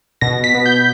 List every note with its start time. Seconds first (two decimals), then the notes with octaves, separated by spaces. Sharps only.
0.21 B2 A#6
0.44 B6
0.54 B3
0.66 G6